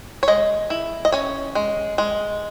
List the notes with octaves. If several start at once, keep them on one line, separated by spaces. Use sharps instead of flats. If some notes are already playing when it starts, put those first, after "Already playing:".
C#5
G#3 D#5
E4
D#5
C#4 C#5
G#3
G#3